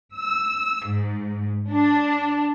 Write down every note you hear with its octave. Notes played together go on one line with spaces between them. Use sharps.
E6
G#2
D4